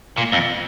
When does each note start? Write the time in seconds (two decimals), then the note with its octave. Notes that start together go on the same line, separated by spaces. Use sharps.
0.18 A#2
0.32 F2